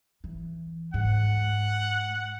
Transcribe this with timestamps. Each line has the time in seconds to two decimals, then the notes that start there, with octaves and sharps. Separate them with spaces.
0.24 E3
0.94 G#2 F#5